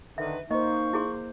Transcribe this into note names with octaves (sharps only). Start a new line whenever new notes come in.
D3 D#3 B4 E5
A#3 D#4 C5 D#5 C#6
E4 G#4 C6